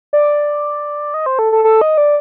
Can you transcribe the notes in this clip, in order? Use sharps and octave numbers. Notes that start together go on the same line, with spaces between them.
D5
D#5
C5
A4
A4
A4
D#5
D5